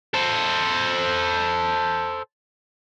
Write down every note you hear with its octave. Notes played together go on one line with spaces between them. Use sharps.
A4 C5